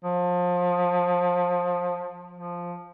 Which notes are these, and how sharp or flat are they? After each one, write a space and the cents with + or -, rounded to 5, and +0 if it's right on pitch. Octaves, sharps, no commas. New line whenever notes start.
F3 +25
F3 +0